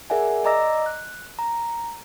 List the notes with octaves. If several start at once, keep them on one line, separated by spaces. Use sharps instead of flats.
G#4 A#4 D5 E5 F#5 G#5
D5 D#5 A#5 D6 E6 A#6
F#6
A#5